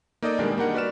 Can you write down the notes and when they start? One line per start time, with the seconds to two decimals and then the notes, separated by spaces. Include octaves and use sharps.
0.22 A#3 D#4 A4 D5 D#5
0.39 B2 D#3 G3 G#3 D4 A#4
0.57 G3 A#3 D4 D#4 A#4 F#5
0.74 F#4 B4 D5 F6 E7